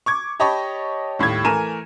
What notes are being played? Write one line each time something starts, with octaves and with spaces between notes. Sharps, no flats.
C#6 D6 G#6
G4 C#5 D#5 A5 B5 C#6
D#2 A2 G3 G4 G#6
E3 A3 A#4 G#5 D#7 E7